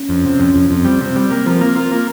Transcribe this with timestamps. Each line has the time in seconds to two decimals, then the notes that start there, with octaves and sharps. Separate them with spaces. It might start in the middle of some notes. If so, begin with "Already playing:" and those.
Already playing: C#4
0.09 F2
0.25 C3
0.39 F2
0.55 F2
0.70 F2 C4
0.85 G3
1.00 C3 C4
1.16 G3
1.30 A#3 C4
1.46 F3
1.61 A#3 C4
1.76 F4
1.92 A#3